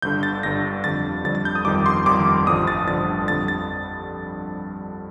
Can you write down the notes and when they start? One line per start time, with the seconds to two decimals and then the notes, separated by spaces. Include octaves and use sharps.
0.02 G1 G2 D3 G6
0.23 A6
0.43 G1 G2 D3 A#6
0.84 F2 D3 G3 A6
1.25 F2 D3 G3 A6
1.35 A6
1.45 G6
1.55 D#6
1.65 G1 F2 D#3 G3 D6
1.86 C6
2.06 G1 F2 D#3 G3 D6
2.47 A1 G2 D3 F3 D#6
2.67 A6
2.87 A1 G2 D3 F3 A6
3.28 F2 D3 G3 A6
3.48 A6